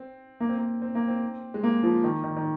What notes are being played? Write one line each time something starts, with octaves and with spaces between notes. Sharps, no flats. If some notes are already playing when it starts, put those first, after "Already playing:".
Already playing: C4
A#3
C4
A#3
C4
A#3
C4
G#3
A#3
F3
D#3
D#3
D#3